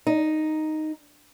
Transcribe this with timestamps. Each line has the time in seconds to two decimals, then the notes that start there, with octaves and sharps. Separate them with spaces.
0.07 D#4